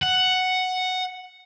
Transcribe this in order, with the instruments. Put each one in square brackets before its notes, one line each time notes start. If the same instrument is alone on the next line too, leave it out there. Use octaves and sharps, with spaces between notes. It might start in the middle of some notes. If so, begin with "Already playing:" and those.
[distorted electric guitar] F#5